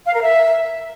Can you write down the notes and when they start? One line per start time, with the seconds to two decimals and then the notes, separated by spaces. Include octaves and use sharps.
0.05 F5
0.13 A#4
0.22 E5